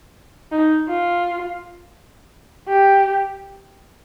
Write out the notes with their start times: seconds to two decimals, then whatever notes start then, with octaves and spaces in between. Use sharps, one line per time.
0.52 D#4
0.88 F4
2.68 G4